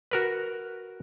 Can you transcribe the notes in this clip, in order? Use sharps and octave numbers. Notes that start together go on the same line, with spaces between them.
F#4 A#4 B4